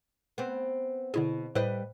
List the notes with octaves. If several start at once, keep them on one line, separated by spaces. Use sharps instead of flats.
B3 C4
B2 D3 E4 G#4
A2 G3 B4 C5 D#5